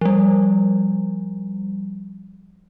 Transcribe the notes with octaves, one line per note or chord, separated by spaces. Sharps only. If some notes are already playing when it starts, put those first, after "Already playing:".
F3 G3